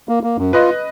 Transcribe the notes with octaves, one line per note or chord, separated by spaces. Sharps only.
A#3
A#3
F#2
F4 B4 D#5